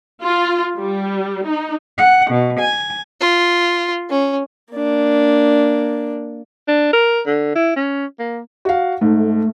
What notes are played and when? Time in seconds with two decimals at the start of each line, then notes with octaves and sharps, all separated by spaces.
0.23 F4
0.78 G3
1.46 D#4
1.97 F#5
2.30 B2
2.59 G#5
3.21 F4
4.10 C#4
4.74 A#3 D4
6.68 D4
6.93 A#4
7.26 D3
7.55 E4
7.76 C#4
8.19 A#3
8.65 F#4 F5
9.01 G#2 A3